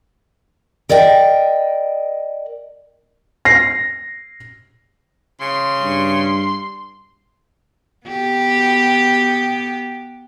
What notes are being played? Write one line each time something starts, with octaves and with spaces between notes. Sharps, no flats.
A#4 D5 D#5 G5
A#6 C7
C#3 C6
G2
B3 G4